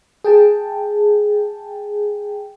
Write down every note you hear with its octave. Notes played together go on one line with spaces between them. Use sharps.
G#4 G5 A5